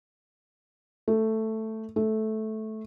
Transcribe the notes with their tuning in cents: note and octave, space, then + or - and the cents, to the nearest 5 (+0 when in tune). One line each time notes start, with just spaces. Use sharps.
A3 +5
A3 -10